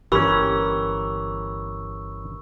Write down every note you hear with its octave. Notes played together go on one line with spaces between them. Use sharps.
G1 E3 C#4 G4 A#4 B5 C#6 E6